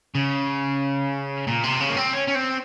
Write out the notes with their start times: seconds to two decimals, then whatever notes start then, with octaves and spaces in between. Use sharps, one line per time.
0.15 C#3
1.47 A#2
1.64 C3
1.80 C#3
1.90 A#3
1.97 C4
2.14 C#4
2.28 C#4
2.36 C4